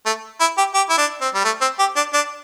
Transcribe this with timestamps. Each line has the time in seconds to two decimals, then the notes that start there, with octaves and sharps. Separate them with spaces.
0.06 A3
0.40 E4
0.57 G4
0.74 G4
0.89 E4
0.98 D4
1.21 C4
1.34 G3
1.44 A3
1.61 C4
1.79 G4
1.96 D4
2.13 D4